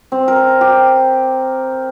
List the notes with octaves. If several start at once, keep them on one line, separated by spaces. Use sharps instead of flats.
C4
A#4
G4